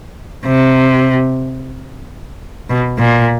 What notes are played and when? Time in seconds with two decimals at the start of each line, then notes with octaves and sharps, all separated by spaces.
0.46 C3
2.69 B2
2.98 A#2